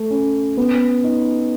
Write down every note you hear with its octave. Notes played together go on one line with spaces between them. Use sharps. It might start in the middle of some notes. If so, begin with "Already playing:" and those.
Already playing: A3
C#4
B3
D#4